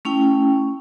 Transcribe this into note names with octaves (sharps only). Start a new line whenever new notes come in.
A3 C#4 E4 G5